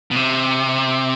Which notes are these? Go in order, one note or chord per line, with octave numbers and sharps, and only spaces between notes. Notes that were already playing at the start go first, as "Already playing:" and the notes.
B2
C3